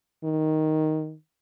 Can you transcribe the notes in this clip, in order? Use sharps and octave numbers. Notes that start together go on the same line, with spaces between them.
D#3